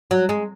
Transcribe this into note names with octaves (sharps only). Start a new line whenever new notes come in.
F#3
G#3